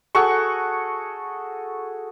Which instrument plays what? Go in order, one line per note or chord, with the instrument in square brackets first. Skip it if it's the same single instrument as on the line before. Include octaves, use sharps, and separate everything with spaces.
[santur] F#4 G#4 A4 C#6